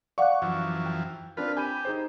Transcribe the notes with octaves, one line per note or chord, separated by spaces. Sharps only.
D5 F5 F#5 C#6 D6 F#6
F#2 E3 F3
G5
C4 D4 F4 A#4 B4
G4 G#5 B5 D#7
D#4 G#4 C5